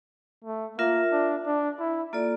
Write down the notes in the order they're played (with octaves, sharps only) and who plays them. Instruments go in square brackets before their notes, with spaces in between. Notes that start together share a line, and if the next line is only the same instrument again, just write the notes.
[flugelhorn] A3
[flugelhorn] A#3 [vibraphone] F4 A#4 E5
[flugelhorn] D4
D4
E4
[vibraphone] A#3 F4 A4 D5